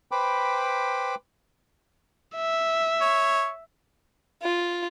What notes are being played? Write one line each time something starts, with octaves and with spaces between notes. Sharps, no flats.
B4 C5 G5 B5 D6
E5
C#5
F4